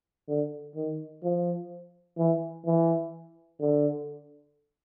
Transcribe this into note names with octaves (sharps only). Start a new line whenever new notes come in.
D3
D#3
F3
E3
E3
D3